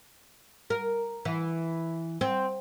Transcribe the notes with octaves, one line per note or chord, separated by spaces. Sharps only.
A#4
E3
C4